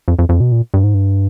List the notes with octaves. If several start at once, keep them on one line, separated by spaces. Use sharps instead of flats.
F2
F2
F2
B2
A#2
G2
G#2
G2